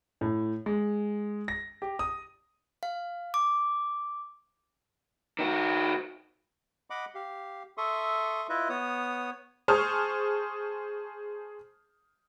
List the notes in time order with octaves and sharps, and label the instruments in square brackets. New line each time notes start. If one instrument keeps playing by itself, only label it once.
[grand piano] A2
G#3
A#6
G4
D#6
[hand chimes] F5
D6
[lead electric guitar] D#3 F#4
[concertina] D#5 F#5 B5 D6
G4 F5
A4 E5 C6 C#6 D#6
E4 F4 B4 D#5 E5
B3 C#5 D#6
[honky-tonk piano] G#4 C5 A5 C#6 D#6 F6